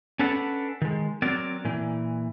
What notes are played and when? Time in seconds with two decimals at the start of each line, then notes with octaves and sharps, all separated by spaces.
0.19 C#4 D4 A4 B4 F#5
0.82 D#3 G#3
1.22 F#3 C4 A#4 D5
1.65 A#2 E3